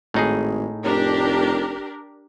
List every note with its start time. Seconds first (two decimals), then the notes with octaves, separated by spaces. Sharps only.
0.14 G#1 A2 D#4 G#4
0.85 F1 D4 G4 A#4